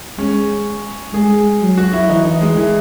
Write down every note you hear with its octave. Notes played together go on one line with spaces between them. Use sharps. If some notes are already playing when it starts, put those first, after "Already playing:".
G#3 C#4
G#3 G#4
F#3
F#4
E4
E3 D#4
D#4
G#3
E3